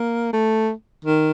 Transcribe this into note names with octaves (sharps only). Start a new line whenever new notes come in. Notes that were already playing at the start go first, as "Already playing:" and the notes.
Already playing: A#3
A3
D#3